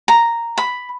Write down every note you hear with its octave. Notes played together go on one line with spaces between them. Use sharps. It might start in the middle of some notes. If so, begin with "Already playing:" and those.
A#5
B5